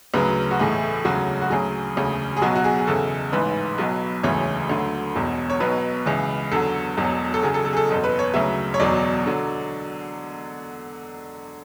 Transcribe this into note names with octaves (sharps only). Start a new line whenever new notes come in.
D2 C#3 F#3 B4
F#4
B1 A2 E3 G#4
E1 D2 C#3 F#3 F#4
F#4
D2 C#3 F#3 G#4
E1 D2 C#3
G#4
B1 B2 F#3 F#4
F#4
G#4
G#4
E2 C#3 E3 A4
A1 G#2 E3 B4
B1 B2 F#3
E1 D2 C#3 E3 C#5
D2 D3 F#3
E1 E2 B2
C#5
B1 B2 F#3 B4
C#2 C#3 E3
E2 D3 F#3 A4
E1 E2 B2 F#3
A4
E2 C#3 F#3 G#4
A4
A4
G#4
A4
F#1 E2 B2 A4
B4
C#5
D2 C#3 F#3 E5
C#5
E1 E2 B2 F#3 D5
D3 F#3